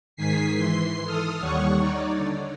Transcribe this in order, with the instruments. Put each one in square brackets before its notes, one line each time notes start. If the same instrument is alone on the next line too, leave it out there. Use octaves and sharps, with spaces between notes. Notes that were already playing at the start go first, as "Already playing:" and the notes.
[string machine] G#2 D#3 G#5 B6 C7
E3 C6 C7
A4 D#6 F6
D#2 G3 C#5 F#5 C#6
D#4 C#5 D5
D3